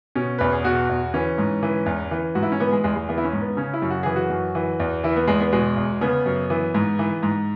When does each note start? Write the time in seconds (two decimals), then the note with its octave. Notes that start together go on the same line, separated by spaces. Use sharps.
0.15 B2 C#4
0.38 E2 B4
0.52 G#4
0.65 B2 F#4
0.89 E2
1.14 E3 C#4
1.38 G#2
1.63 E3
1.86 E2
2.11 E3
2.35 G#2 F#4
2.43 E4
2.52 C#4
2.60 E3 B3
2.72 G#3
2.84 E2 G#3
2.96 G#3
3.09 E3 B3
3.18 E4
3.24 C#4
3.33 G#2
3.41 B3
3.57 C#3 C#4
3.73 E4
3.82 F#2
3.90 F#4
4.03 E3 G#4
4.16 F#4
4.30 F#2
4.55 E3
4.80 E2
5.04 E3 E4
5.16 B3
5.28 E2 G#3
5.40 B3
5.52 B2 G#3
5.77 E2
6.01 C#3 B3
6.26 F#2
6.50 E3
6.74 G#2
6.99 E3
7.23 G#2